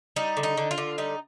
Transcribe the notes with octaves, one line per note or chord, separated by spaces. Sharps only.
G3 D#4
D3
D#4
D3
F4
D3
G3 D#4